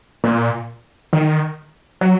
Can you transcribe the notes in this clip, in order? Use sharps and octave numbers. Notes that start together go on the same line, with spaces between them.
A#2
D#3
F#3